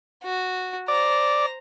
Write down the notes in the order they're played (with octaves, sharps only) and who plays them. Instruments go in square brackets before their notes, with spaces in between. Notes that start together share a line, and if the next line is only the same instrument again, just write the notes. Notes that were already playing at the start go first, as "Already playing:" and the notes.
[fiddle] F#4
[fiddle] C5 A#5 [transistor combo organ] D5